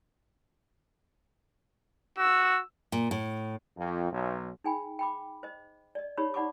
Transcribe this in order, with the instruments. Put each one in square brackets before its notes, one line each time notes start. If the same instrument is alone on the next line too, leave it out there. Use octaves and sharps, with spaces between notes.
[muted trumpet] F#4 [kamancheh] E6
[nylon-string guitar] A#2
A2
[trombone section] F2
B1
[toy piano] D#4 G#4 G5 G#5 B5
G5 B5 D6
C5 D#5
D5 D#5
D#4 G4 C#5 B5
D#4 D5 F#5 B5 C#6 D6